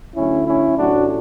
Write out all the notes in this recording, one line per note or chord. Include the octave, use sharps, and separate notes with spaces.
D2 D3 F#3 A3 C#4 E4
C#4 E4
A1 A2 F#3 A3 D4 F#4